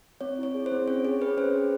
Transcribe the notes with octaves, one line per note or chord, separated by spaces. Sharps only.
C4 C#5
E4 C#5
G#4
C5
C4
C#4 C#5
G#4 C#5
G#4 B4
C#4 C5
G#4